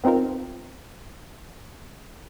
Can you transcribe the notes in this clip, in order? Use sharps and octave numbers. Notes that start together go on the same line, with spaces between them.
B3 C4 D#4 F4 A#4